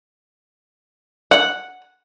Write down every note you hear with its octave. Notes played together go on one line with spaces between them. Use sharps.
F#5